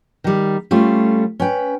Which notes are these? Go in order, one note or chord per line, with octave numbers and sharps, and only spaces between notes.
D#3 G3
G3 A3 C#4 F4
C#4 B4 G5